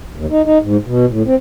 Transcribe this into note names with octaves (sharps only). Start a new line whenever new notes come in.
D#2
D#4
D#4
G#2
B2
A2
C4